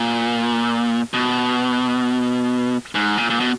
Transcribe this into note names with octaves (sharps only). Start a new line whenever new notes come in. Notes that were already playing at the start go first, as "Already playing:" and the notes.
Already playing: A#2
B2
G#2
A#2
A#2
B2